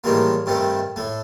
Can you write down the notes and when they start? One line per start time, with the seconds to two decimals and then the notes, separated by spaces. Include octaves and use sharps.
0.04 A2 D#3 E3 G3 G#3 A#3
0.46 G2 C3 D#3 G3 A3
0.96 A2 A3